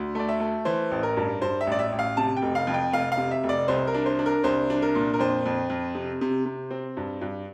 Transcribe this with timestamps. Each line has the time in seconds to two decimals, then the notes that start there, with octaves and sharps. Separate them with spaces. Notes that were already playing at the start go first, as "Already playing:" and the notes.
Already playing: D2
0.15 A3 D5
0.29 E5
0.40 A3
0.65 E3 C5
0.91 A1
1.03 A#4
1.17 G2
1.41 G2 C5
1.61 E5
1.67 A1 D5
1.79 E5
1.92 A1
1.99 F5
2.17 C3 A5
2.37 G5
2.42 F1
2.55 F5
2.67 F2
2.74 G5
2.92 F1 F5
3.12 F5
3.17 C3
3.31 E5
3.43 F1
3.49 D5
3.68 C2 C5
3.87 A#4
3.94 D4
4.06 C5
4.19 D4
4.26 A#4
4.44 C2 C5
4.70 D4
4.82 A#4
4.95 A#2
5.14 A#4
5.19 F2 C5
5.46 F2
5.70 F2
5.95 C3
6.21 C3
6.45 C3
6.71 C4
6.97 G2
7.21 G2